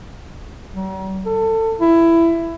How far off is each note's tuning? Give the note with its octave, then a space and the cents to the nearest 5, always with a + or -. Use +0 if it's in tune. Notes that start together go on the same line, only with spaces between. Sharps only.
F#3 +45
A4 +25
E4 +15